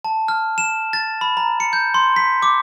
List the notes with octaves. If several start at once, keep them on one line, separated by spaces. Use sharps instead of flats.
A5
F6
E7
A6
B5
A#5
C#7
G6
C6
B6
D6